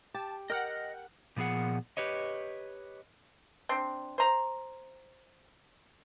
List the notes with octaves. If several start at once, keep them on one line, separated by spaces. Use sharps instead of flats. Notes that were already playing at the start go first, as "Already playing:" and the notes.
G4 A5
A#4 D#5 F#5 G5 F6
A#2 F3 B3 G#4 F#5
G4 B4 C#5 D#5
C4 D4
C5 A#5